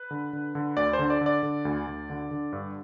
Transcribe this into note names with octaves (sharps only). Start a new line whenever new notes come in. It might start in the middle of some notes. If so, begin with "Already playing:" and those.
Already playing: B4
D3
D3
D3
D2 D5
C5
D3
D5
D3
D5
D3
D2
D2
D3
D3
G2